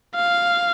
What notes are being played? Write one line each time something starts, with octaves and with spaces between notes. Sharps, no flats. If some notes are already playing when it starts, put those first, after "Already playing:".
F5